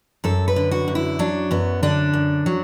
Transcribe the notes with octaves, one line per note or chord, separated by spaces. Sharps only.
F#2 A4
B4
D3
F#4
F#2
E4
F#3 D4
F#2 B3
D3 D4
F#2
F#3